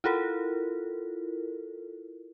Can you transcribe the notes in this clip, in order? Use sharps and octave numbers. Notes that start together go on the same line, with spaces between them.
E4 F4 A4 A#4